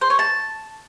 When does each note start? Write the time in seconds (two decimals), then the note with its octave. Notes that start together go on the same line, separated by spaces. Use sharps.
0.01 C5
0.10 C#5
0.19 A5